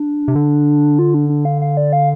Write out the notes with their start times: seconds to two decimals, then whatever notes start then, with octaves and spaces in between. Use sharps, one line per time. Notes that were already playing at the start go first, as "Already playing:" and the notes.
Already playing: D4
0.28 C3
0.35 D3
0.99 F4
1.14 D4
1.29 D4
1.45 F5
1.61 F5
1.77 D5
1.93 F5